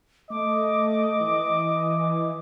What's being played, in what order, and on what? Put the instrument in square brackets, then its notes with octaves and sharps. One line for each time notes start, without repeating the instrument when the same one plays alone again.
[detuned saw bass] A3 [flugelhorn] D#5 [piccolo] D6
[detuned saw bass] E3